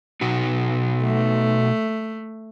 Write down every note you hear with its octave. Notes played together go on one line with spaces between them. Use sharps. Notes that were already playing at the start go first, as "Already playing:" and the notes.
B2 D#4 F#4
A3